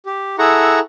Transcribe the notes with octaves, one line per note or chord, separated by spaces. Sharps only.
G4
E4 G#4 A4 F#5 A#5 C#6